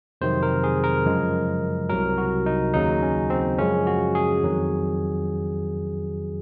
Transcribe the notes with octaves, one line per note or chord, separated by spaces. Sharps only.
F2 C3 D#3 F#3 C5
A#4
G#4
A#4
F#2 C#3 F3 G#3
C2 C3 F#3 A#4
F#4
D#4
D#2 C#3 F#3 D#4
C#4
C4
F#2 C#3 F3 G#3 C#4
F#4
G#4
F2 D#3 F#3